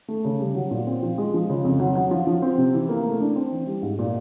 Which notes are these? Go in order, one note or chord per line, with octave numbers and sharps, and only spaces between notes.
A3
C#3
G3
F#3
A#2
C4
F3
G#3
F3
C#3
F2
F#3
F#3
F3
F3
C4
C3
E3
A#3
A3
D4
C4
E3
G3
G#2
A#2